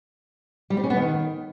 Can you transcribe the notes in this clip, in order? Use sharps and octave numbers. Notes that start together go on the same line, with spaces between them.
G3
C4
C#4
B3
D#3